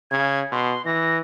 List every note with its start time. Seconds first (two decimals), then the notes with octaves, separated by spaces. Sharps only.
0.11 C#3 G#6
0.52 B2 C6
0.86 E3 A#6